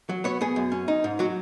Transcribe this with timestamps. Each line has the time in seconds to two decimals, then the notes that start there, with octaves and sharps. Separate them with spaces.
0.09 F#3
0.24 B3 C#5
0.41 B3 G#4
0.56 F#2
0.72 C#4
0.88 D#4
1.04 G#2
1.19 F#3 F#4